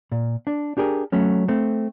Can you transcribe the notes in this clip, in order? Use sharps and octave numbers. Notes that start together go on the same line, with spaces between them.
A#2
D4
D4 G4 G#4 A#4
F#3 A3 C#4
A3 C4